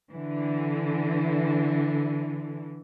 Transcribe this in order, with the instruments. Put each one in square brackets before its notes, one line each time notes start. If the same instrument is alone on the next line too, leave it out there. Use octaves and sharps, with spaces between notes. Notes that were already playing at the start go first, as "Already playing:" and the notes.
[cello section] D3 E3